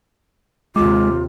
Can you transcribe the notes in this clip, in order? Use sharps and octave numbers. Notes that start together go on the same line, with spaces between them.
D#2 C3 G#3 F4 D6